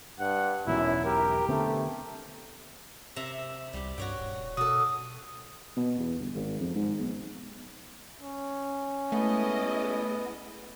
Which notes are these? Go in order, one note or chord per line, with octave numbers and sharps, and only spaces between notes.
G2 F#5
E1 B1 F#2 E4
G4 A#4
D3 A3 B3 C4
C3 E5 A#5
C2 G3 G4
G2 F#4 C#5 G5
D#1
B2 F#4 A4 D#6
B2
E2
G1
G#1
F2
G#2
B1
C#4
G#3 A3 B3 E4 D#5